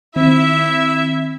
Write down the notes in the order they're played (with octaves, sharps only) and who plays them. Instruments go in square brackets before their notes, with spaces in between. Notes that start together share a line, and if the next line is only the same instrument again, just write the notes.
[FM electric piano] D#3 C4 [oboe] E4 [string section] E5